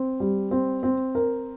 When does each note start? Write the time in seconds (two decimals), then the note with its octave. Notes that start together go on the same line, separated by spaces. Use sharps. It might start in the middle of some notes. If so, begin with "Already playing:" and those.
Already playing: C4
0.20 G3
0.51 C4
0.83 C4
1.15 A#4